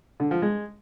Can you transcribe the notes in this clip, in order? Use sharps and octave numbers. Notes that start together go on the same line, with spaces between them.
D3
F3
G#3